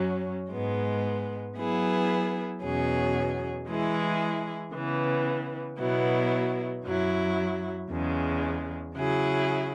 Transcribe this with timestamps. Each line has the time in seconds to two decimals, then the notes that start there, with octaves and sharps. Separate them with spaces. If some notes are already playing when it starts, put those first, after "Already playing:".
Already playing: F#2 F#3 C#4
0.52 G#2 G#3 B3
1.57 F#3 B3 E4 G#4 B4
2.63 E2 B2 F#3 C#4 G#4
3.68 E3 G#3 E4 G#4
4.74 C#3 E3 B3
5.78 B2 F#3 B3 E4
6.84 F#2 F#3 E4
7.90 E2 C#3 G#3
8.95 C#3 F#3 E4 G#4